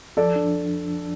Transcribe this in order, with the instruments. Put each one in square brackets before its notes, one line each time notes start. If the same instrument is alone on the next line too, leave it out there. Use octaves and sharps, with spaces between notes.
[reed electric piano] F3 [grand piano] A4 D5
[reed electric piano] D4